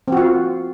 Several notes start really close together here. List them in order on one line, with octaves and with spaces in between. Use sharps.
C4 F#4 F4